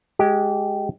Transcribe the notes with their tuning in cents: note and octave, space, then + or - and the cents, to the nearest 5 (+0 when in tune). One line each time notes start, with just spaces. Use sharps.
G#3 +0 G4 -20